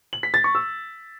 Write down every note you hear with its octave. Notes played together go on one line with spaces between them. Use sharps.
F#7
B6
A6
C#6
E6